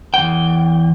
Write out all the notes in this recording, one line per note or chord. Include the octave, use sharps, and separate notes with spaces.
E2 G5